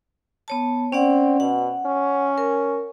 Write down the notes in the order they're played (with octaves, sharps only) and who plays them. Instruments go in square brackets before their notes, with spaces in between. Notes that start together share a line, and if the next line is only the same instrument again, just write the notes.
[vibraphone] B3 C#5 A5
[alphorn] C4 [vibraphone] C#4 D5 F#5
[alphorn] B2 [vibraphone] F#5
[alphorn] C#4
[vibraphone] A#4